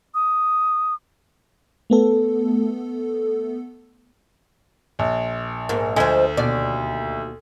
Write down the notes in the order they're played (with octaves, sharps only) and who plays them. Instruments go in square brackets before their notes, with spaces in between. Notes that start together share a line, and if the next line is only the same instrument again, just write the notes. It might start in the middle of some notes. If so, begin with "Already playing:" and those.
[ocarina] D#6
[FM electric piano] A3 B3 A4
[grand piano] A#1
[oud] G#2 A#3
[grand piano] D2 [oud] F3 G#3
[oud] D#2 B2 D5